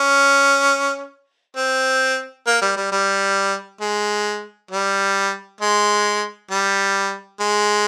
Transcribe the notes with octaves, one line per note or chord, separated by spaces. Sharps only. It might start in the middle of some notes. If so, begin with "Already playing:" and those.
Already playing: C#4
C4
A#3
G3
G3
G3
G#3
G3
G#3
G3
G#3